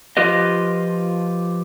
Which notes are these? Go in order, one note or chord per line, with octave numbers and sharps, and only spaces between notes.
F3 F4 G4 B4 D#5